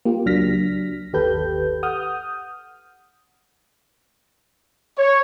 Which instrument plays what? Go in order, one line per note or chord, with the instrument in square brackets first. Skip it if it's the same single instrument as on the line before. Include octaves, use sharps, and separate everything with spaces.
[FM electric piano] A#3 F4 G4
C#2 F#3 D4 F6 A#6 B6
G1 D#2 G4 A4 B4 G6
F#5 D#6 F6 G6
[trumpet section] C#5